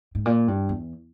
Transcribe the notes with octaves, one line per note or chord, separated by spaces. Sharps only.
G#2
A#2
G2
E2